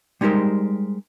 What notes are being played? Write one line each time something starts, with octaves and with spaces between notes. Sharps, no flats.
G3 G#3 D#4 G4 A#4 C5